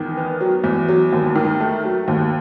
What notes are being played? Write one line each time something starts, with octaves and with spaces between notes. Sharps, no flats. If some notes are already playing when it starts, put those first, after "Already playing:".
Already playing: E2 D#3
B3
F#3
E2
F#3
D#2
D#3
A3
F#3
D#2